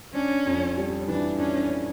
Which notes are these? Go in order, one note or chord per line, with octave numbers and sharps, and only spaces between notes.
C#4 D4
F2
G3
E3 D4
C#4 D4